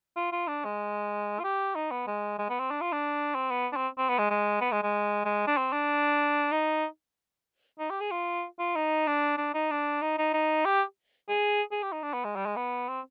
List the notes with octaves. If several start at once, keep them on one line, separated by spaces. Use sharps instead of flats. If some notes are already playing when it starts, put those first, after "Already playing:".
F4
F4
D4
G#3
F4
G4
D#4
B3
G#3
G#3
B3
C4
D4
F4
D4
C4
B3
D4
C4
C4
B3
G#3
G#3
B3
G#3
G#3
G#3
D4
C4
D4
D#4
D#4
G4
G#4
F4
F4
D#4
D4
D4
D#4
D4
D#4
D#4
D#4
G4
G#4
G#4
G4
D#4
D4
B3
G#3
G3
G#3
B3
C4